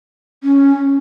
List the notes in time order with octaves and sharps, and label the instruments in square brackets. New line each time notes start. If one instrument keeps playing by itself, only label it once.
[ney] C#4